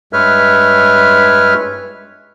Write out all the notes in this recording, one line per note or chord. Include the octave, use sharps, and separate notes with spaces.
G2 G#3 B4 C#5 E5 F6